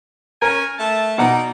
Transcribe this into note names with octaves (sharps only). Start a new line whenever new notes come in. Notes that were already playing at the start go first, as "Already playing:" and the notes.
C#4 A#4 G#5
A3 E5 A5
B2 D#4 D5 F#5 A#5